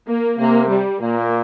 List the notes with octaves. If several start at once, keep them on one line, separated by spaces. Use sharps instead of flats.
A#3
C3 A#3
G3
A#2 A#3